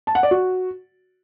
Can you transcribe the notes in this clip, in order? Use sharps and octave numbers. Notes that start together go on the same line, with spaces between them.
A5
F#5
D5
F#4